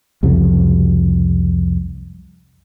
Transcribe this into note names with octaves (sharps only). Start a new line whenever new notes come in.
C2 F2 C#3 F#3